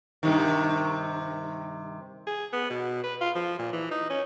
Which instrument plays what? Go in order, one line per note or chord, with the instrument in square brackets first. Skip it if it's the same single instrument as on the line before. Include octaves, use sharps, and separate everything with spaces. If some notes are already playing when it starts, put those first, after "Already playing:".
[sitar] G2 C3 D#3
[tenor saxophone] G#4
B3
B2
B4
F4
F3
A#2
E3
D#4
C#4